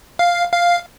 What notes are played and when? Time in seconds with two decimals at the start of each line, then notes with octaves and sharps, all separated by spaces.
0.19 F5
0.53 F5